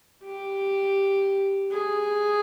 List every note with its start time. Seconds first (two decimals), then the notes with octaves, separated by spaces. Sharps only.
0.24 G4
1.71 G#4